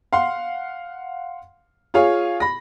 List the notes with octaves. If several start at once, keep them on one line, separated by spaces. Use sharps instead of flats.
F5 F#5 C6
F4 G#4 C#5 F5
B5 A#6